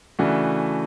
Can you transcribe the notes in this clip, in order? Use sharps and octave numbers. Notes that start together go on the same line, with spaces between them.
C#3 E3 A3 D4 F#4